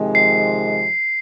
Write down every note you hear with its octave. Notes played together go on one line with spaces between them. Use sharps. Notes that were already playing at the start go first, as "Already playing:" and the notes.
Already playing: F2 C3 D#3 G#3
C7